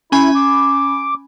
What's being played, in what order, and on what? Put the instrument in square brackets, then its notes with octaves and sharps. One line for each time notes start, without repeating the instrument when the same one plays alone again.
[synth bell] C#4 G#5 B5 [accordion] E4
[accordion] D6